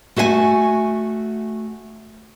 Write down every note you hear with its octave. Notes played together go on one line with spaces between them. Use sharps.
A3 F#4 E5 F5 G#5